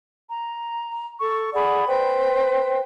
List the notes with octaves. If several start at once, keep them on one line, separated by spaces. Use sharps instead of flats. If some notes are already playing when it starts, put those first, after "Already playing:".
A#5
A4 C#6
G#4 D5 F#5 B5
B4 C5 G5